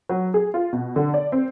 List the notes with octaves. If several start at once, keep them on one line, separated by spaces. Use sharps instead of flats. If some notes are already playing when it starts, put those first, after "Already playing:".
F#3
G#4
F4
B2
D3
D5
C4